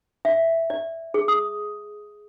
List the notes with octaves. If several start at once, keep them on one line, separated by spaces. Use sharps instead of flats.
E5
D5
G#4
D#6